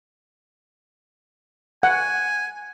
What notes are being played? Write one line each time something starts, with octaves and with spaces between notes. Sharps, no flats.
F#5 G#5